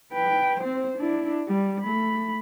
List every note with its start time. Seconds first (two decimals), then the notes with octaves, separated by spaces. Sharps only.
0.12 B4 G5
0.60 C4 C5
0.97 D4 E4
1.48 G3
1.83 A3 B5